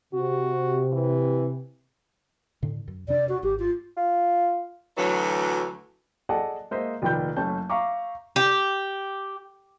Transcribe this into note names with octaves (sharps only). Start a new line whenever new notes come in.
C3 F#4
E3
A2 D3
F#2
F2 C3 D4 D5
F#4
G#1 G4
F4
F4
D2 E3 F#3
G#4 A4 D5 D#5 F#5 A5
G#3 A#3 C5 D#5 E5
F1 A#2 D#3 G5 B5 G6
F#1 A3 C#4 A5 G6
E5 F5 A#5 C#6 D6
G4